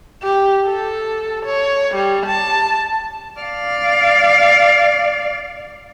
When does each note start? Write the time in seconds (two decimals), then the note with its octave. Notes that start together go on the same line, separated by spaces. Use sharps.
0.23 G4
0.65 A4
1.46 C#5
1.95 G3
2.26 A5
3.40 D5 F5